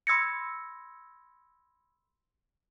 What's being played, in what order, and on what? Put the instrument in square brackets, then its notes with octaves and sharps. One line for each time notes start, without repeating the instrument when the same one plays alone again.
[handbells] B5 C6 E6 G#6 A#6 C#7